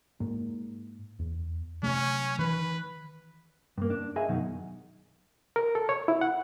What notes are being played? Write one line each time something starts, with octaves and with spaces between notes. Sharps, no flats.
G#2 A#3
E2
C3 F#3 A3 C#4
D#3 E3 B4
G2 A#3
D4
G#4 D#5 E5 G#5
F#2 B2 D#3 F#3 D#4
A#4
A4
C#5
E4
F#5